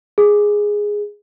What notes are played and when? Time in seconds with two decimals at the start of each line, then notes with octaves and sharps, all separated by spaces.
0.18 G#4